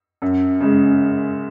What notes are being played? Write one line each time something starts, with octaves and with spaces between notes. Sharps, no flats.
F#2
C#3 G#3